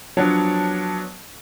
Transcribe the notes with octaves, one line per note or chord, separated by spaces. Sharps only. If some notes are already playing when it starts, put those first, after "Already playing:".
F3 F#3 B3 D4 C#5 A5